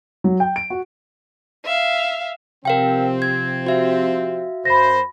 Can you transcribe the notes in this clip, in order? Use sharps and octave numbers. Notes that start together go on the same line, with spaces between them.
F#3
G5
D7
F#4
E5 F5
C3 F3 C4 A#4 F5 G5
G#6
F#4 E5 F5
F#2 C5 B5 A#6